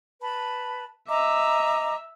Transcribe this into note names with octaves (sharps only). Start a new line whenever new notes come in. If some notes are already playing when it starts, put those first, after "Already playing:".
B4 A5 B5
D#5 E5 A#5 D6